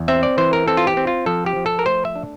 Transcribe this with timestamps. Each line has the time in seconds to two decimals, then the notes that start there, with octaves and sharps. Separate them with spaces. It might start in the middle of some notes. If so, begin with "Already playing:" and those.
Already playing: E2
0.08 C4 E5
0.23 D5
0.38 E3 C5
0.53 A#4
0.68 C4 A4
0.77 F4
0.87 G4
0.97 C4
1.07 F4
1.26 F3 A4
1.46 G4
1.56 F3
1.66 A4
1.79 A#4
1.86 A3 C5
2.05 E5
2.16 D4